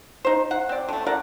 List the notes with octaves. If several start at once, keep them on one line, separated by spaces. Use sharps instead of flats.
D#4 C5
F#5
C4 D5
D3 A3
D3 A#4 D5 F#5